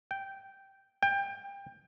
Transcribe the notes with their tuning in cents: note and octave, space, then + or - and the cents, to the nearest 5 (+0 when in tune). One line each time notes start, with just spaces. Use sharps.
G5 -5
G5 +25